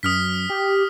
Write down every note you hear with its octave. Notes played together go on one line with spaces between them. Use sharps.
F#2 D#6 F6 B6
G4